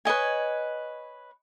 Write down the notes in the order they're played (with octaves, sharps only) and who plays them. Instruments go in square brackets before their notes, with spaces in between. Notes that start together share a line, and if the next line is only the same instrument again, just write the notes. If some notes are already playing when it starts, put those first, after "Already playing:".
[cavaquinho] B4 C#5 D#5 G#5